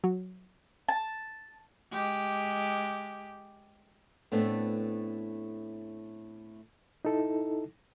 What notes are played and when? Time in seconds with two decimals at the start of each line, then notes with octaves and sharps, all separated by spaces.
0.04 F#3
0.89 A5
1.91 G#3 G4
4.32 A2 A3 B3 C4 D4
7.05 D#4 E4 A4